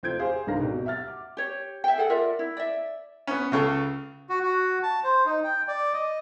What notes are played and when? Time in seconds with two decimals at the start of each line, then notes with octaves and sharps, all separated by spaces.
0.03 F1 C4 F4 G6 G#6 D7
0.19 G4 G#4 C5 F5
0.47 C#2 G#2 D4 A#4 F5 A#6
0.60 G#1 B2 G4
0.86 E5 F#5 F6 A6
1.08 D6
1.37 G4 C#5
1.84 E5 G5
1.98 G#4 A4 F#5
2.10 F4 A#4 D5 E5
2.39 E4
2.57 D5 E5
3.27 B3 C#4
3.52 C#2 C#3 A4
4.30 F#4
4.43 F#4
4.83 A5
5.04 C5
5.26 D#4
5.44 G5
5.68 D5
5.93 D#5